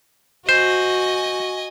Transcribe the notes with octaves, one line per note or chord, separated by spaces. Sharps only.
F#4 C5 D#5 G#5